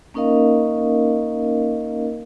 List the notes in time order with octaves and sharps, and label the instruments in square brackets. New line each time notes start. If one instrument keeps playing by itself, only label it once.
[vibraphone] A#3 C#4 D#4 A#4 D#5 F5